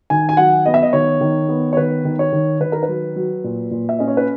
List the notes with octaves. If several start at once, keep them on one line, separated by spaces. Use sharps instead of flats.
D#3 G#5
G#5
F#3 F#5
B3 D#5
E5
D#5
D#3 C#5
D#3
B3
C#5
D#3 B4
D#3
C#5
D#3
D#3 B4
A#4
B4
F#3
F#3
A#2
A#2
E5
C#4 D#5
C#5
B4